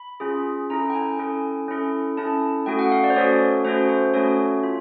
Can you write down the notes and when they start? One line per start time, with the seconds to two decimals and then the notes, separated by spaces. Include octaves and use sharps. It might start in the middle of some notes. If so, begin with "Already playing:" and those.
Already playing: B5
0.20 C#4 F4 G#4
0.70 C#4 E4 A4 A#5
0.90 G5
0.94 G#5
1.19 C#4 E4 A4
1.68 C#4 E4 A4
2.17 C#4 E4 A4 A5
2.66 A3 C#4 F#4 A4 G5
2.79 F#5
2.92 F5
3.04 D5
3.10 C5
3.16 A3 C#4 F#4 A4 C#5
3.65 A3 C#4 F#4 A4 C5
3.89 C5
4.14 A3 C#4 F#4 A4 C#5
4.63 F4